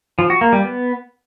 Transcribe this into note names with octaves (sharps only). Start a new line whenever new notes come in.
F3
F#4
A#3
G3
B3